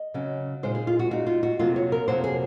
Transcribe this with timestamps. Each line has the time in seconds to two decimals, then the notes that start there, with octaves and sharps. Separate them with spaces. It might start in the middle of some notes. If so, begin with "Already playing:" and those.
Already playing: D#5
0.14 C#3 F#3 C#4
0.63 A#2 G#3 D#4 C5
0.75 G#4
0.87 F4
0.99 F#4
1.11 A#2 G#3 D#4 F#4
1.27 F4
1.43 F#4
1.59 F2 C3 F#3 A#3 F4
1.76 C#5
1.92 A#4
2.08 F2 C3 F#3 A#3 C5
2.24 G#4